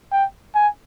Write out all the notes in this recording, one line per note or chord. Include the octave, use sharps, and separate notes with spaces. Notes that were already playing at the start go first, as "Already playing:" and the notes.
G5
G#5